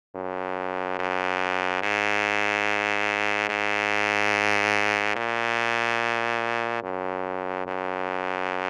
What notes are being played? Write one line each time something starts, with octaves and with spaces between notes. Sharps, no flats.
F#2
F#2
G#2
G#2
A#2
F#2
F#2